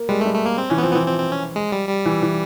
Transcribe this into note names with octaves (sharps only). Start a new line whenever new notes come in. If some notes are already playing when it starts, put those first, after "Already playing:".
Already playing: A#3
G3 G#3
A3
G3
A3
A#3
C4
E3 C#4
B3
F3 C4
B3
E3 C4
F3 C4
C4
C#4
G#3
G3
G3
E3
E3